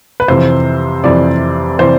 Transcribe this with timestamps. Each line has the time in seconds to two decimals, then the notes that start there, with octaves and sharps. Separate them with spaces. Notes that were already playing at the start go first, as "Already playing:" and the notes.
0.20 B4
0.28 F2 C3 E3 C5
1.04 F2 C3 E3 D5
1.79 C3 E3 C5